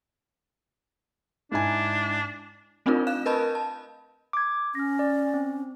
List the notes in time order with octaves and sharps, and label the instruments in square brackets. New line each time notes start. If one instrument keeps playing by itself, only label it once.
[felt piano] G#2 E4 G#5 [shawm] D4
[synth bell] A3 C4 D4 D#4 F4 A#4
F5 F#6 E7
A#4 B4 D#5 A5 B5 G6
A5
[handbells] D6 G#6
[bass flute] C#4 [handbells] F6 A#6
[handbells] D5
C4